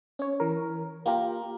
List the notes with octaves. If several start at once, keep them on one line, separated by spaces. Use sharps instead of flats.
C#4 C#5
E3 A#4
A#3 F4 G4 A#4